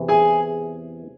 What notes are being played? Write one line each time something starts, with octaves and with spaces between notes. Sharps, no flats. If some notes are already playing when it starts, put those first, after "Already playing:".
Already playing: E2 C3 E3
G#4 G#5